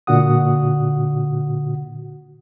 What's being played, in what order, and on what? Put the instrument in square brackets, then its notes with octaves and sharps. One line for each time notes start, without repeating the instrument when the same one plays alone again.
[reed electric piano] A#2 D3 F#4 F#5 D#6